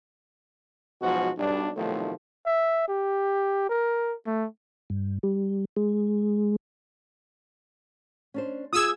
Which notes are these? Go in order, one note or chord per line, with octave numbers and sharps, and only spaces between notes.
G#2 B2 F3 F#3 F#4
B1 G3 D4
B1 A2 C3 D#3 F3 A3
E5
G4
A#4
A3
G2
G3
G#3
C#4 D4 C5
F4 G#4 D#6 E6 G#6